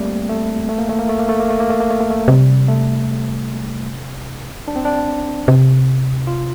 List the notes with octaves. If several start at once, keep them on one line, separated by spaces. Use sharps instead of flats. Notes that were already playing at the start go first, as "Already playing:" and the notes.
Already playing: G3 A3 A#3 C4
A3
A3
A#3
A3
A#3
A3
A#3
A3
A#3
A3
A#3
A3
A#3
A3
A#3
A3
C3 G3
A3
D4
C4
D4
C3
F4